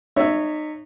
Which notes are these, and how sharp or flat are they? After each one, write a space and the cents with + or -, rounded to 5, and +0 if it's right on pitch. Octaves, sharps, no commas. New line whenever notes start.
D#4 -30 C#5 +0 E5 +0